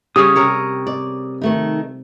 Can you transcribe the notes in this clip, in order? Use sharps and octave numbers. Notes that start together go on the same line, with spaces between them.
C#3 G3 C#4 G4 D#6
C3 A#4 C#5
D5
D#3 A3 D#4